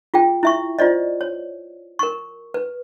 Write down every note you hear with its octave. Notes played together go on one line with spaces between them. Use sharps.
F4 G#4 G5
E4 E5 C#6
F4 C5 D5 D#5
C#5
A#4 C#6
B4